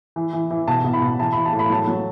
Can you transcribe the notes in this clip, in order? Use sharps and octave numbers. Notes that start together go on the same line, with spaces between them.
E3
E3
E3
B2 A5
B2
B5
B2
E3 A5
E3 B5
A5
A2
B5
F#3 A5
F#3